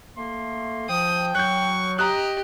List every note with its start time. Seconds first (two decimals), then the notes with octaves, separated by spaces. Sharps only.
0.17 A3 A#3 C6
0.89 F3 G5 D#6
1.35 F#3 C#6 F#6 G6
1.99 G4 D#5 A#5 F#6